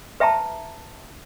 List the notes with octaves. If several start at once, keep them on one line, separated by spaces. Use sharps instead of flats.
B4 E5 G5 A5 A#5